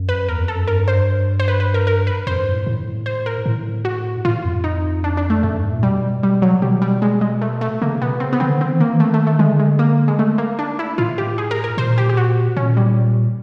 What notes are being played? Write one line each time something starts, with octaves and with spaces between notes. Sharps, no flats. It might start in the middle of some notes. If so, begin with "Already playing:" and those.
Already playing: F#2
B4
E2 A#4
F2
A4
F#2
G2 A#4
C5
C5
B4
B4
A#4
A#4
B4
F2 C5
G2
A2
A2
C5
A#4
A2
F#4
A2 F4
F2
D#4
D4
D4
A3
F2 A3
F#2
G#2
A#2
B2 G3
G3
F#3
B2 G3
G3
G#3
G#3
A3
A3
C#3 A#3
B2 B3
C#3 C4
B3
D3 C4
D#3 C4
E3
D#3 A#3
E3
D#3 A3
A3
A3
D3 G#3
G#3
A#3
G#3
A3
A#3
D4
E4
A2 F4
G4
G#4
A#4
A#4
A#2 C5
G4
G4
F#4
A#2 C#4
G3